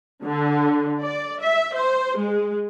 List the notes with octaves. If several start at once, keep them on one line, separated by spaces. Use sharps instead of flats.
D3
D5
E5
C5
G#3